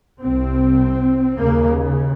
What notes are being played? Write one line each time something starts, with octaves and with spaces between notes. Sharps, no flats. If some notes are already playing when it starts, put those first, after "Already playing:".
C2 C3 C4
D#2 A#3
C#3